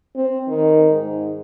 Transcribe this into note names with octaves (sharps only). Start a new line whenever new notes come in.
C4
D#3
G#2